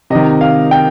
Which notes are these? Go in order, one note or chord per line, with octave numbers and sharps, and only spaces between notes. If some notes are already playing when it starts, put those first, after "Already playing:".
C3 D#3 D#5
F5
G5